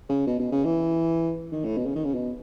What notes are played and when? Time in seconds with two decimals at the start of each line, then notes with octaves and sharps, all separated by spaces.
0.09 C#3
0.27 B2
0.39 B2
0.52 C#3
0.65 E3
1.52 D#3
1.64 A2
1.77 B2
1.86 C#3
1.95 D#3
2.05 C#3
2.14 B2